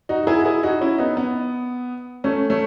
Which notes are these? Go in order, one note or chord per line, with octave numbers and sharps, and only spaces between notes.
D#4 F#4
F#4
E4 G#4
F#4
E4 G#4
D#4 F#4
C#4 E4
B3 D#4
B3
A3 C#4
A3 C#4